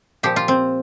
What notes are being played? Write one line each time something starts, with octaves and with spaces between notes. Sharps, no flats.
A#2 F3 G4
F4
C4